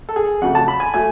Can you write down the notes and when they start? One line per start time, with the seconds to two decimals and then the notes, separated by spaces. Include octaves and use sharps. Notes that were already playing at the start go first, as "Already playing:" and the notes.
0.09 A4
0.16 G#4
0.41 F2 C#3 F#3 A3 F#5
0.55 A5
0.68 B5
0.80 G#5
0.94 F#3 A3 G#5